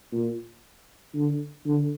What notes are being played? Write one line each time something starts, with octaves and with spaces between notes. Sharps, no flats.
A#2
D3
D3